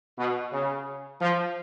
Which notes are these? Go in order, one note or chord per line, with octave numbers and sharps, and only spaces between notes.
B2
C#3
F3